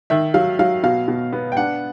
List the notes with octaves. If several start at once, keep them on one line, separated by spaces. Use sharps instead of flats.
D#3 E5
F#3 F5
F#3 F5
B2 F5
B2
B3
G5
D4 F#5